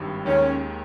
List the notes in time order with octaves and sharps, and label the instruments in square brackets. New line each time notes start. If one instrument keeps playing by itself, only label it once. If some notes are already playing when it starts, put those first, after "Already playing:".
Already playing: [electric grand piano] G#1 G2 G3
[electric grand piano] D#2 D#3 G#3 [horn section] C#4